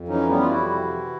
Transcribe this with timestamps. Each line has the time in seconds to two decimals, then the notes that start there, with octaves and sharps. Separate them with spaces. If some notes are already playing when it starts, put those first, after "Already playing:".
Already playing: F2
0.08 E3 C#4 D#4
0.28 G3 B3 C#4
0.41 F4
0.48 F2 E4 F#4
0.69 C3
0.89 E3